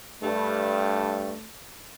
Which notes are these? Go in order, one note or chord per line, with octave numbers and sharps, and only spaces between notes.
G2 A3